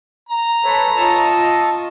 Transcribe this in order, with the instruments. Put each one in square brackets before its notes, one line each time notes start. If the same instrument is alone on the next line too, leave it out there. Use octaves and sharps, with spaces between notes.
[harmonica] A#5
[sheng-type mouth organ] A4 C#5 [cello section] B4
[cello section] F4 D#5 [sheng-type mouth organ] A5 C#6 E6